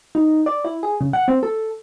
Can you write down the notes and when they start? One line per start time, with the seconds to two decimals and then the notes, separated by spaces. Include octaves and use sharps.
0.15 D#4
0.46 D5
0.64 E4
0.83 G#4
1.01 C#3
1.13 F#5
1.28 C4
1.43 A4